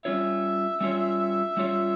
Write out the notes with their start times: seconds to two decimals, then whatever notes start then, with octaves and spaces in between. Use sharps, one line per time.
0.05 G3 C#4 F4 C#5 E5
0.81 G3 C#4 F4 C#5
1.57 G3 C#4 F4 C#5